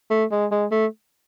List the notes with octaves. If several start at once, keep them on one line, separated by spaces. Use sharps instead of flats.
A3
G#3
G#3
A3